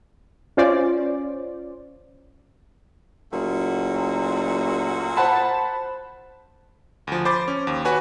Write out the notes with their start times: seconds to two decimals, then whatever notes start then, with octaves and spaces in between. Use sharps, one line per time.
0.57 C#4 F4 C5 D5
3.33 F#1 A#2 A3 F#4
5.17 C5 F#5 A5 B5
7.07 D2 F3
7.25 C5 B5 D6 A6
7.48 C#4
7.67 D#2
7.85 F#4 B4 C#5 G#5